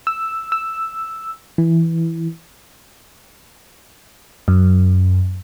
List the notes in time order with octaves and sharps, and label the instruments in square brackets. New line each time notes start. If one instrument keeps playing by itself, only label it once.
[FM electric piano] E6
E6
E3
F#2